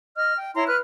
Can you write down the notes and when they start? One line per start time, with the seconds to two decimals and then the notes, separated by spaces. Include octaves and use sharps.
0.16 D#5 F6
0.38 G5
0.55 E4 C#5 A#5 C6
0.67 B4 F6 F#6